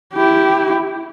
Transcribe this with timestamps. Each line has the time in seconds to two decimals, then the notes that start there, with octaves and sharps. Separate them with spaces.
0.13 E4 G4